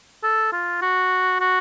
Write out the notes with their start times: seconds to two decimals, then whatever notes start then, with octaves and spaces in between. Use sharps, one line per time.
0.23 A4
0.52 F4
0.81 F#4
1.40 F#4